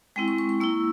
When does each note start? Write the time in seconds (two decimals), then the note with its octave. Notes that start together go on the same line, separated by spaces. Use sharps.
0.16 G#3 C4 E4 G5
0.28 C#6
0.38 C#6
0.49 C#6
0.60 A#3 E4 E6